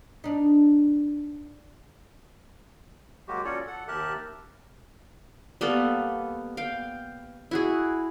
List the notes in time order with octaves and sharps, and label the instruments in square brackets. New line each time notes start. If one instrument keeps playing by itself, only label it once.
[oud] D4 D#4
[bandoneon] F#3 G#3 A#3 F#4 G4
C#4 F4 F#4 A4 C#5 D5
A4 F#5
D#2 G4 A#4 E5 A5 F#6
[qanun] G3 A#3 B3 A4
F5 G5
E4 F#4 G#4